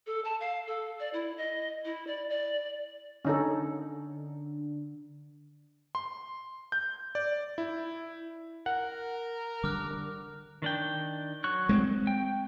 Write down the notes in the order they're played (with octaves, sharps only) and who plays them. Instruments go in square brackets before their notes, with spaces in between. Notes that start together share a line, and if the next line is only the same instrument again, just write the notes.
[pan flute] A4
A5
F5
A4
D5
E4
D#5
E4
D5
D5
[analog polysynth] D3 [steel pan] C#4 D#4 A4
[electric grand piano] C6
G6
D5
E4
[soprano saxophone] A#4 [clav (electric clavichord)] F#5
[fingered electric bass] D3 G3 D4 [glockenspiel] D6 F6 F#6
[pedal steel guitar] D#3 D4 G5
F#3 C#6 F#6
[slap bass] G#3 B3 C4
[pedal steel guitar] G5